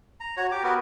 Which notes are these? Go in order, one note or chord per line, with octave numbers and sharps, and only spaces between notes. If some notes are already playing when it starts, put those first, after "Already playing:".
A#5
F#4 C#5 A#5
G4 D6
B3 F#4 A#4 B4